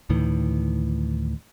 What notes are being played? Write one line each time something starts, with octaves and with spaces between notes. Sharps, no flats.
D2 A2 D#3 E3